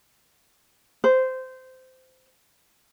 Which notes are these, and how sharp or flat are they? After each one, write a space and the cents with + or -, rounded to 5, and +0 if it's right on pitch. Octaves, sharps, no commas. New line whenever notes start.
C5 -15